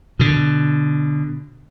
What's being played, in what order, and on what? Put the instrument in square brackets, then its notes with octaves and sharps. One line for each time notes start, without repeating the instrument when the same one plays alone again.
[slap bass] B2 D3